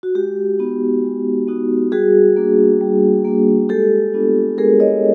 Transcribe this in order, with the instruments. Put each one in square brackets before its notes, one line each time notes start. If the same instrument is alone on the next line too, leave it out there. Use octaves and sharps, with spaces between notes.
[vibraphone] F#4
G#3 G4
B3 D#4 F#4
G#3
B3 D#4 F#4
G3 F#4 G#4
A#3 D4
G3
A#3 D4
G#3 G4 A4
B3 D4 F4
G#3 G#4 A#4
C#5 D#5